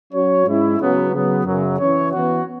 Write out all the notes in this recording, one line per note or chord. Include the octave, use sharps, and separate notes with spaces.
F#3 C#4 F#4 C#5
G#2 G#3 C#4 E4
C#3 F#3 B3
C#3 F#3 B3
F#2 C#3 F#3
E3 C#4 E4 C#5
E3 B3 F#4